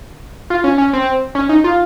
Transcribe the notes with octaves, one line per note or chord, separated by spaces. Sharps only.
F4
C#4
C#4
C4
C#4
D#4
F4